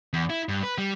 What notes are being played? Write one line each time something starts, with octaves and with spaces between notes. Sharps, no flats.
E2
E4
G2
B4
G3